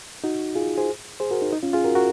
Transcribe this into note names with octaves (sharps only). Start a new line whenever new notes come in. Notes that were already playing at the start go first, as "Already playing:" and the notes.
D#4 F#4
F4 G#4
G#4 C5
G#4 C5
F#4 A#4
D#4
D#4
C#4 F4
F4 G#4
F#4 A#4
F#4 A#4